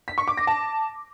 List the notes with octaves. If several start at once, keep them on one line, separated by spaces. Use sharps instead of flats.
B6
C#6
D6
A#6
A5